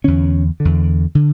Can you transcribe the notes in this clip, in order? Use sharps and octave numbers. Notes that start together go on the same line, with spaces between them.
E2 D3 C#4
D3
E2
D3